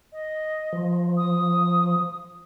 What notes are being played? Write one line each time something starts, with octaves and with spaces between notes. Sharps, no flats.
D#5
F3
D#6